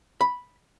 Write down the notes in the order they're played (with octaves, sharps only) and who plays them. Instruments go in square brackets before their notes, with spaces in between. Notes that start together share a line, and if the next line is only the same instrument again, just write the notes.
[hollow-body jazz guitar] B5